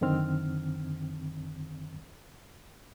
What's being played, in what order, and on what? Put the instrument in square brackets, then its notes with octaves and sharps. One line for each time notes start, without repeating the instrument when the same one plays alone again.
[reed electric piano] F#2 D3 D#3 C4 F6